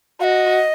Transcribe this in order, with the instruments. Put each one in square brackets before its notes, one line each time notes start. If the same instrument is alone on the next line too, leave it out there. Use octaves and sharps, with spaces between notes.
[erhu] F#4 [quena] D#5 F5